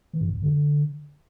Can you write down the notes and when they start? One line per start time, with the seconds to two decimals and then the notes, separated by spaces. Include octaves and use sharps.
0.13 E3
0.21 G2
0.28 F2
0.35 F#2
0.42 D3